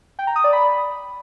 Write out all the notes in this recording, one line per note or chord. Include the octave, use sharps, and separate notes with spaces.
G5
A#5
D#6
D5
B5